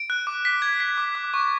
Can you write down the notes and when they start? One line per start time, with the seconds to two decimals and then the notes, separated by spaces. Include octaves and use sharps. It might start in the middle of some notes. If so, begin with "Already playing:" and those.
Already playing: D7
0.10 F#6
0.27 D6
0.45 B6
0.62 G#6
0.80 B6
0.98 D6
1.15 D6
1.34 C#6